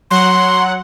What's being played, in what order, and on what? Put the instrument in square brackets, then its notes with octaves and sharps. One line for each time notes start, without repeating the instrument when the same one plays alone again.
[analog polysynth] F#3 F#5 [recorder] C6